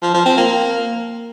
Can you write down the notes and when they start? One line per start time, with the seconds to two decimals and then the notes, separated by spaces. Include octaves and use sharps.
0.02 F3
0.14 F3
0.26 C4
0.37 A#3